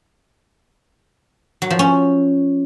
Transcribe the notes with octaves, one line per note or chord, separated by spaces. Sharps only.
F#3
F3
C#4